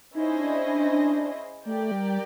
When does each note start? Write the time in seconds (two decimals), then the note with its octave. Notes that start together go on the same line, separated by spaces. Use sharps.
0.15 C#4 D#4 E4 G#4 C5 D#5
0.40 D4
0.65 D4
0.91 D4
1.66 A3 G4 A#4 D5 G5
1.91 G3